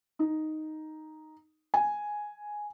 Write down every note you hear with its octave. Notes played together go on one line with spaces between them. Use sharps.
D#4
G#5